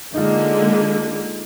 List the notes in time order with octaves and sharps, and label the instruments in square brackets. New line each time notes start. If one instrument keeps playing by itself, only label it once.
[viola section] D3 G#3 A#3 [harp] D#4 F4